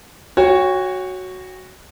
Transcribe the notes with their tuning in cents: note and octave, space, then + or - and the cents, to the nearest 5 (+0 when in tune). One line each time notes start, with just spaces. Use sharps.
F#4 +0 C#5 +0 G5 +40